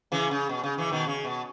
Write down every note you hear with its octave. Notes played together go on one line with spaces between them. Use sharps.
C#3 E3
C#3
B2
C#3
C#3 E3
B2 D#3
C#3
B2